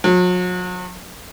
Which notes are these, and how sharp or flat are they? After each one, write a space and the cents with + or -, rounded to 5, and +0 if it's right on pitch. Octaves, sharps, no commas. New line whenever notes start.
F#3 -40